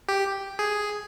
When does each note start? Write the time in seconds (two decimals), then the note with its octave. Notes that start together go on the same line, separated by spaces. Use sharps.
0.09 G4
0.59 G#4